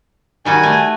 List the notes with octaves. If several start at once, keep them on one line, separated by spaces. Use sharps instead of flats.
D#3 G3 F#4 G#5
A3